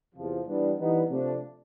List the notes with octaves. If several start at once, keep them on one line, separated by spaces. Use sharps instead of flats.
E2 C3 F3
E3 G3 B3 D4
E3 G3 B3 D#4
C3 F3 A3 D4